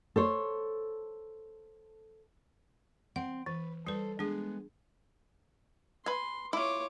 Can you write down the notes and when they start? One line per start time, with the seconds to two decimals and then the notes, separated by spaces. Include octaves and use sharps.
0.16 A4 C5 C#5
3.16 C4 F#5
3.46 E3 B4
3.87 G3 A4 B4 C5
4.19 G#3 B3 D4 G#4
6.06 B4 G#5 C6
6.53 E4 F4 C#5 D6